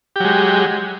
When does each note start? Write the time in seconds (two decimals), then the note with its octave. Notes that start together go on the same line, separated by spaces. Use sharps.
0.16 G4
0.20 F#3
0.25 G#3